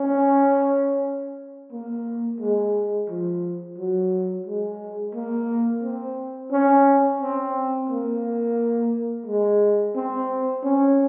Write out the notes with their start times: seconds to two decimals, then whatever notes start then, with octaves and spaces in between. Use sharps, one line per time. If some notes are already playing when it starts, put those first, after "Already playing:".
Already playing: C#4
1.72 A#3
2.40 G#3
3.10 F3
3.78 F#3
4.47 G#3
5.15 A#3
5.83 C4
6.52 C#4
7.21 C4
7.89 A#3
9.27 G#3
9.95 C4
10.64 C#4